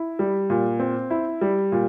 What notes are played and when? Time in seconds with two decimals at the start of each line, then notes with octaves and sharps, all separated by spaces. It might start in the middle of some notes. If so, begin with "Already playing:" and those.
Already playing: E4
0.19 G3
0.50 A#2
0.80 C4
1.10 E4
1.41 G3
1.72 A#2